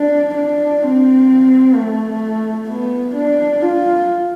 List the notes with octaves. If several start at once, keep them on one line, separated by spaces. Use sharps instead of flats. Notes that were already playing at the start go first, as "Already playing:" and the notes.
Already playing: D4
D4
C4
A3
B3
D4
F4